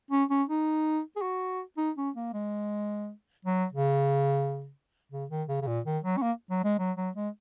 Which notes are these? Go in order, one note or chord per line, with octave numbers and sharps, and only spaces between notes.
C#4
C#4
D#4
G#4
F#4
D#4
C#4
A#3
G#3
F#3
C#3
C#3
D#3
C#3
C#3
A#2
D#3
F#3
C#4
A#3
F#3
G#3
F#3
F#3
G#3